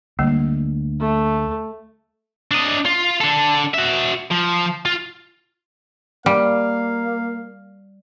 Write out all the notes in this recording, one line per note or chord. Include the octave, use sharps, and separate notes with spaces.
D2 D3 G3 A#3
A3
D4 D#5
F4
D4 A4
F#4 E5
F3
F4
G3 A#3 F5